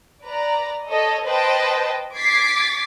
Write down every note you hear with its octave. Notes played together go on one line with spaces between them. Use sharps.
B4 D5 A#5
A4 C#5 D#5
B4 C5 D#5 G5 A5
D6 G#6 A6 B6 C7